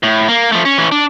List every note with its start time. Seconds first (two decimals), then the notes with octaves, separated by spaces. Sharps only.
0.03 A2
0.28 A#3
0.52 F3 A3
0.65 C#4
0.78 E3 C#4
0.92 D4